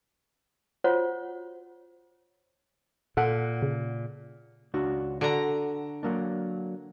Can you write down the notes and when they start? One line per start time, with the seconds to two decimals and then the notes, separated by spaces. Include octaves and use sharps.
0.84 F4 F#4 C5 C#5 F#5
3.17 A#2 A4 F#5 F#6
3.62 C#3
4.74 C#2 D4 F#4
5.21 D3 F#4 A#5
6.03 F#3 A#3 D4